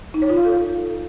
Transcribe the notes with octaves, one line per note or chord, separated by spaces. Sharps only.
D#4
C#5
F4
F5
A4